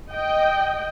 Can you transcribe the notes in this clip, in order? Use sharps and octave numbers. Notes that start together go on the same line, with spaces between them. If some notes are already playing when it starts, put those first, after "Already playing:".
D#5 G5